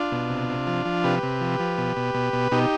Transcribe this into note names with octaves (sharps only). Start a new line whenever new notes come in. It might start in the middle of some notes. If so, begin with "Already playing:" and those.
Already playing: D4 F4
B2
C3
C3
F3
F3
C3 G4 B4
C3
F3
F3
B2
B2
B2
B2
B2 D#4 G4